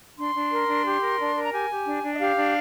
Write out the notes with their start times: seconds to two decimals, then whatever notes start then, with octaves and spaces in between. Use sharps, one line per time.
0.18 D4 C6
0.35 D4
0.51 A#4
0.68 D4
0.85 G4
1.02 A#4
1.20 D4
1.35 A#4
1.45 A#5
1.52 G4 G#5
1.69 G4
1.86 D4
2.03 D4
2.14 D#5
2.20 G4 F5
2.36 D4